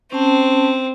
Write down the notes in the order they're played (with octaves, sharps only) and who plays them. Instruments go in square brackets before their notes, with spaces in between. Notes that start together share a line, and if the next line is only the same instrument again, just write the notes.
[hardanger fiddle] C4 [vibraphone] C#4 A5